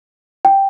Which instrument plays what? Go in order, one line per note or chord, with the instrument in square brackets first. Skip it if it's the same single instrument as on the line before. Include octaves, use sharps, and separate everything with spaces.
[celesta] G5